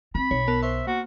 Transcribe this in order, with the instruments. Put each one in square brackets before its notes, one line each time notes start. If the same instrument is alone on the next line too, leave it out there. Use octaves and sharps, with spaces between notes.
[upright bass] C4 [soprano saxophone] B5
[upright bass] B1 [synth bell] C#5
[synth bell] B3 A#4 A5
[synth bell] C5 C6 C#6 [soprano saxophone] E5
[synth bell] A#3 [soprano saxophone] F#4